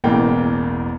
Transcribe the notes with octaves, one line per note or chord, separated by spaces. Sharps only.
E1 A1 E2 A#3 G5